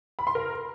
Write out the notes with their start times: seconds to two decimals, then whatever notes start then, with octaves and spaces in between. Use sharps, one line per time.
0.19 B5
0.27 C6
0.35 A#4